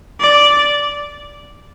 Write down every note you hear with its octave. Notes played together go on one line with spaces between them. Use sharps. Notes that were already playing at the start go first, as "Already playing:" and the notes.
D5